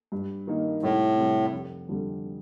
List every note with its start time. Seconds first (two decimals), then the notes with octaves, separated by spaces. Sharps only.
0.12 G2
0.47 D#3 A#3 D#4
0.83 C2 A2
1.18 C3 G3
1.53 F1
1.88 F2 D3 G3